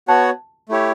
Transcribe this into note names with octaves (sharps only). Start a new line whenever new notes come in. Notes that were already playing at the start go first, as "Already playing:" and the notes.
B3 F#4 C#5 F#5 A5
A3 E4 G4 C#5